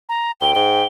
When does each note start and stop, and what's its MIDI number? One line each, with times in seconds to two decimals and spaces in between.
0.09 0.32 82
0.41 0.53 38
0.41 0.85 79
0.41 0.51 103
0.55 0.83 44
0.55 0.87 103